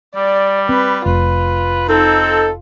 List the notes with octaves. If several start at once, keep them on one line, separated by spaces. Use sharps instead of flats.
G3 D5
C4 B4
F1 F4 B4
C4 D#4 A4